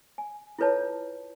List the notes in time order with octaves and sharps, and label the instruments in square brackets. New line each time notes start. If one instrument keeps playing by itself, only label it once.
[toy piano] G#5
E4 F4 A4 B4 C#5 A5